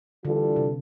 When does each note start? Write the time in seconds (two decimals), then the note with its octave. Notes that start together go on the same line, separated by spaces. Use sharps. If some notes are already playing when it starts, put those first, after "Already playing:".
0.25 D3 E3 G3 D4 F4 A4
0.56 C3